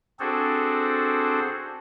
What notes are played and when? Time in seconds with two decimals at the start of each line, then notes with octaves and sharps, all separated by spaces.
0.20 C4 D4 F#4 G#4 A4 C5